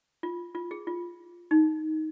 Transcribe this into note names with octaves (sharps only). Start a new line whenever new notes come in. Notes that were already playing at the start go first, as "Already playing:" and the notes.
F4
F4
G#4
F4
D#4